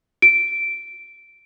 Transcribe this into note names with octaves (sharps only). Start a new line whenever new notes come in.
D7